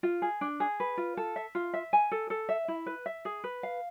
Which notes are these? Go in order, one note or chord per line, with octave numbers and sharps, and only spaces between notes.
F4
G#4
D4
G#4
B4
F4
A4
E5
F4
E5
G#5
A4
A4
E5
E4
B4
E5
G#4
B4
F5